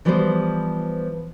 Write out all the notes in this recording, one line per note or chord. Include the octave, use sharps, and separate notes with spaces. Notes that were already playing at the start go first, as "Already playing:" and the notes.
E3 F3 G3 B3 F4 C5